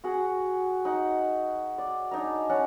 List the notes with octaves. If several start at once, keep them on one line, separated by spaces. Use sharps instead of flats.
F#4 G#4 F#5
D#4 F#5
D5
D4 D#4 G#5 A#5
C#4 F#5 A5 A#5